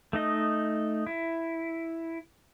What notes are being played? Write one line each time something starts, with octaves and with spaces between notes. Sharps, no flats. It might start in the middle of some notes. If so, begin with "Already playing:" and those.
A3 D#4 D#5
E4